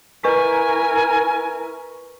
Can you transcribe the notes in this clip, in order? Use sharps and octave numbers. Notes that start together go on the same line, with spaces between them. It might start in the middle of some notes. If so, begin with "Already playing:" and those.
E4 A#4 B4 G#5 C#6 B6